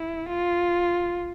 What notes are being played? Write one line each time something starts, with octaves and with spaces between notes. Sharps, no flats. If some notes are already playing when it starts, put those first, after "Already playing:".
Already playing: E4
F4